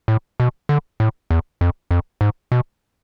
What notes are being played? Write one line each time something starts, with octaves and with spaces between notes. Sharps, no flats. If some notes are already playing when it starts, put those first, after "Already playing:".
A2
B2
D3
A2
E2
F2
F2
G#2
B2